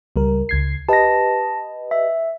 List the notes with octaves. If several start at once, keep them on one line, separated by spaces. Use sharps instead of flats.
C#2 G3 A#4
C#2 G#6 C7
G4 B4 D#5 A5 A#6
E5